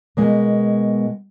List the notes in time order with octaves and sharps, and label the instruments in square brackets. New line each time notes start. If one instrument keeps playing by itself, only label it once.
[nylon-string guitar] B2 G#3 A#3